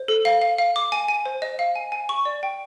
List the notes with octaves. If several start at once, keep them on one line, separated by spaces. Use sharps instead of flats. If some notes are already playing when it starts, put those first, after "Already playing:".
Already playing: C5
A4
F5
F5
F5
D6
G#5
G#5
C5
D#5
F5
G#5
G#5
C#6
D5
G5